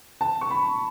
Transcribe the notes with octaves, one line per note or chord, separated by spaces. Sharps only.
A5
C#6
B5